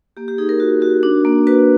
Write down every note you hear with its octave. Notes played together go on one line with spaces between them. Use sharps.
A#3 G4
G4
D#4 G#4
A#4
F#4
F#4
D4
A#3
F#4 B4